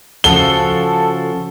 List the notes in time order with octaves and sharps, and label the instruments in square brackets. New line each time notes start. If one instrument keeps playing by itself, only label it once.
[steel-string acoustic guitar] C#3 F3 F#4 [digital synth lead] A4 [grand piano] G7